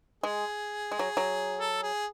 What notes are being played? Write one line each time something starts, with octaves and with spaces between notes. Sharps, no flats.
G#3 G#4
G#3
F#3
F#3
A4
G#4